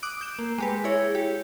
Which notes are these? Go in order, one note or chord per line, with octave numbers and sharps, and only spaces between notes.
D6 D#6 F#6 D7
G6 D7 E7
A#3
G#3 G4 B4
E4 G#4 C#5
G4